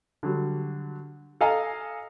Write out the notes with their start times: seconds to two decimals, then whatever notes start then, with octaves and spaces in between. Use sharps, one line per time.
0.23 D3 F#3 G3
1.41 A4 D#5 F5 G#5 A#5